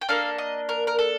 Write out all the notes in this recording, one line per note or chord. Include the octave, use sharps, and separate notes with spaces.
G5
A#3 D4 A4 F5
D#5
A#4
A#4
A4